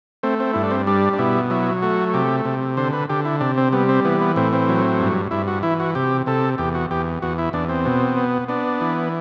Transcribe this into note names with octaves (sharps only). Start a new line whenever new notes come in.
A3 C4
C4
G2 E4
D4
C4
G3 D4
D4
B2 E4
F#3 E4
A3 F#4
C3 G4
C3
D3 C5
B4
D3 G4
E4
C3 D4
C4
G3 B3
C4
E3 B3
B3
A2 C4
C4
F#3
G2
G2 E4
F#4
E3 E4
F#4
C3 G4
C3 A4
E2 G4
F#4
E2 G4
E2 F#4
E4
E2 D4
C4
B2
B3
B3 D4
E3